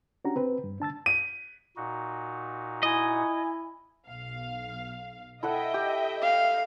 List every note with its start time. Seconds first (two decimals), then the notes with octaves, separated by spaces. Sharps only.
0.25 C#4 D4 F#4 G4 A#5
0.36 C4 B4
0.64 G2
0.80 D4 A5 E6 A6
1.06 D#7
1.77 A#2 D#4 F#4
2.83 E4 D#5 G#5
4.07 B1 F5
5.43 E4 A4 D#5 E5 F#5 G5
5.74 G4
6.22 F5